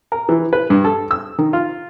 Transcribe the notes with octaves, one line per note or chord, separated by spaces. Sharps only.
A#4
E3
B4
G2
A4
E6
D#3
F4